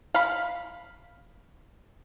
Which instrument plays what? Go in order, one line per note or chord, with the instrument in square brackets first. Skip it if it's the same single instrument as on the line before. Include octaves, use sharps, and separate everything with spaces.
[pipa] F5 B5